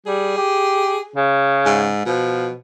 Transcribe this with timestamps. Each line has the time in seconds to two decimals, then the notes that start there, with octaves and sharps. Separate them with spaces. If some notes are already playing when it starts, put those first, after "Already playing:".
0.06 G3 G#4
0.37 G4
1.16 C#3
1.66 G#2
2.06 B2 F3